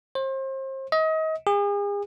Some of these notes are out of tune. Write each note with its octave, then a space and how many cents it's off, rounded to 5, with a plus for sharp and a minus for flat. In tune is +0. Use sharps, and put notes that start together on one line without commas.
C5 +35
D#5 +30
G#4 -40